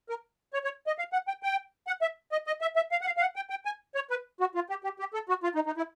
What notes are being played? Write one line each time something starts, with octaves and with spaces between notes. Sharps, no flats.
A#4
C#5
C#5
D#5
F5
F#5
G5
G5
F#5
E5
D#5
D#5
E5
E5
F5
F#5
F5
F5
F#5
G5
G5
G#5
C#5
B4
F#4
F4
G4
G4
G4
A4
F#4
F4
D#4
D#4
E4